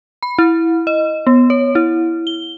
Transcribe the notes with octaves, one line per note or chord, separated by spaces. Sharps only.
B5
E4
D#5
B3
C#5
E4
G7